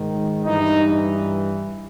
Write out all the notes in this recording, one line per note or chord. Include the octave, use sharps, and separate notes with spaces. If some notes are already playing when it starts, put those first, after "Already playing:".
Already playing: G#2 D#3
G2 E3 D#4